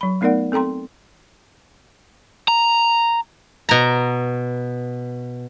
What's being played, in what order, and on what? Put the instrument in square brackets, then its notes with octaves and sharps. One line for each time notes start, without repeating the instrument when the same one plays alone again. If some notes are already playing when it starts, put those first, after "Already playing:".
[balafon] F#3 B5
A3 B3 D#4 A#4 D5 F#5
C4 A4 G5 A#5 C6
[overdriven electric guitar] A#5
[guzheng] B2 A#5